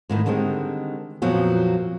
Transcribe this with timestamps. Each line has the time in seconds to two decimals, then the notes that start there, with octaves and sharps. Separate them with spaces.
0.09 G#2 D#3 E3 A3
0.26 D3 D#3 G3 G#3 C4
1.22 F2 A#2 F3 F#3 B3